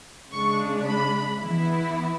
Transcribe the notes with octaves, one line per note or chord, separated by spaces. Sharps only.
C#3 G#3 D4 C#6
B5
E3 B3 E4